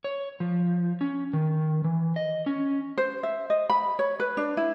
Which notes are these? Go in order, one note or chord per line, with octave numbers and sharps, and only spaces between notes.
C#5
F3
C#4
D#3
E3
D#5
C#4
C5
E5
D#5
B5
C#5
B4
D4
E4